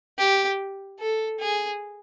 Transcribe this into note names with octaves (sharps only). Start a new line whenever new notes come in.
G4
A4
G#4